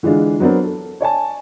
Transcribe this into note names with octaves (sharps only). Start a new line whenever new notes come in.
D3 E3 G#3 D4 F4
F#3 B3 C4 D4 A#4
A4
C#5 D5 G#5 A5